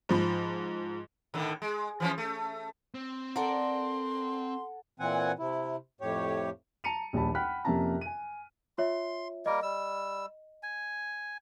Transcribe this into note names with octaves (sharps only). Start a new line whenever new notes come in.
G#2 F3 B5
A2 D3 D#3
G#3
E3 F3 C#4
A3
C4
A4 A#4 D5 F#5 C6
A#2 E3 C4 F#5 G#5
C3 E4
F2 A2 G4 C#5
A5 A#5 C#7 D#7 F7
A#1 D#2 G3 G4 A5 B5
F#5 G5 B5 F6 F#6 B6
F2 C3 A#3 C#4 A5 A#5
G#5 D#7
F4 C#5 E5 C6
G3 A#3 A#4 D#5
G3 E6
G#5